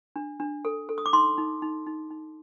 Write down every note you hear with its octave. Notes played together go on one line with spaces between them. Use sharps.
D4
D4
A4
A4
D#6
D6
D#4 C6
D#4
D#4
D#4
D#4